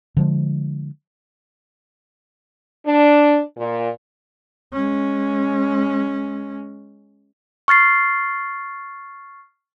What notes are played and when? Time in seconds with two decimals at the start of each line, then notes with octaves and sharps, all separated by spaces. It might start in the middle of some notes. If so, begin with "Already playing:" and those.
0.17 D3 F3 G#3
2.87 D4
3.57 A#2
4.73 G#3 C#4
7.68 C#6 F6 A6 C7